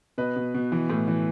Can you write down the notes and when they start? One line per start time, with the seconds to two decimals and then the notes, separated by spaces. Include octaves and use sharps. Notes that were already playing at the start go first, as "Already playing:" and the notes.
0.18 B2 B4 D#5
0.36 B2
0.54 B2
0.72 E3
0.90 A2
1.08 E3